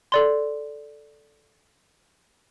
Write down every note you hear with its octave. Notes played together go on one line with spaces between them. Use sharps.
A4 D5 C6